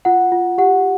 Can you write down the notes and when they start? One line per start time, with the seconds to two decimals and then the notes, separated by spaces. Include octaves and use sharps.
0.05 F4 F#5
0.32 F4
0.58 G4 F#5